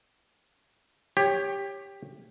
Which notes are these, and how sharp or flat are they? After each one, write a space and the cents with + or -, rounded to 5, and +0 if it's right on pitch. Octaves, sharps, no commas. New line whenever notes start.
G4 +10 C#5 +0